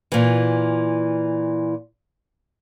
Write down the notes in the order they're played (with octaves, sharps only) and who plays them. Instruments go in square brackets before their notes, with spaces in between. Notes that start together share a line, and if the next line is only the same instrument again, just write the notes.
[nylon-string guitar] A#2 E3